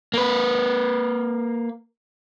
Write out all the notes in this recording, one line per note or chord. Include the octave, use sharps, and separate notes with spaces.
A#3 B4